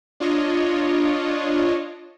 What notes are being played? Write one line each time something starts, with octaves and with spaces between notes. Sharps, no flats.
D4 F4 C#5 D#5